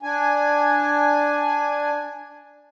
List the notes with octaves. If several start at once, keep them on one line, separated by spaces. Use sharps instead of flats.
D4 G#5